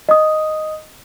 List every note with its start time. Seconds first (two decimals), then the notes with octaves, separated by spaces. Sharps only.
0.09 D#5 D#6